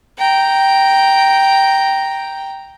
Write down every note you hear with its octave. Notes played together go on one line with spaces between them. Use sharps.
G5 A#5